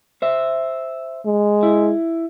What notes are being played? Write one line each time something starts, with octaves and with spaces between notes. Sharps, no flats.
C5 E5
G#3
E4